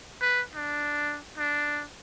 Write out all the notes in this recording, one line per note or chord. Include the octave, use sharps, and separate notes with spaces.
B4
D4
D4